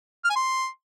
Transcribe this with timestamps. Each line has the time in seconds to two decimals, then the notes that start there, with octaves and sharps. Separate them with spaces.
0.24 F6
0.30 G#5
0.36 C6